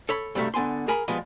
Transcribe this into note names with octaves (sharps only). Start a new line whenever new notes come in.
A4 C#5 B5
G2 C3 G3 A3 F#4 E5
D3 B3 G#5 C6
G#4 A#4 G#5 B5
F3 G3 G#3 B3 D#5